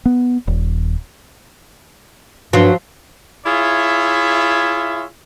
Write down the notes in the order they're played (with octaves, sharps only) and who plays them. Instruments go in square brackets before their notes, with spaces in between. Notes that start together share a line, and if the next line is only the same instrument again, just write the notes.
[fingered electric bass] B3
D#1
[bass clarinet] G2 [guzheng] F3 C5 [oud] F#3
[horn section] E4 F4 G#4 C#5 E5